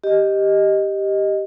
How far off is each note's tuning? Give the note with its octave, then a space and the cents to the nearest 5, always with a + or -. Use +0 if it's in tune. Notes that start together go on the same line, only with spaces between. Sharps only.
G4 +0 D#5 +0